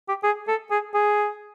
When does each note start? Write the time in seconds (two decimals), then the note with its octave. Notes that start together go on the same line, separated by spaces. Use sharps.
0.09 G4
0.23 G#4
0.48 A4
0.71 G#4
0.94 G#4